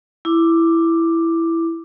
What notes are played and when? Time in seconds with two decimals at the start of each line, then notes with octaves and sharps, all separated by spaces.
0.25 E4 D6